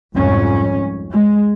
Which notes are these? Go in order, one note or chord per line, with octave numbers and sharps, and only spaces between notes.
C2 F2 G#2 C#4
G#3